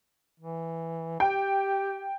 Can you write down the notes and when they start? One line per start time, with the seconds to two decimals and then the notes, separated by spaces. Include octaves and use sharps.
0.40 E3
1.20 G4 G5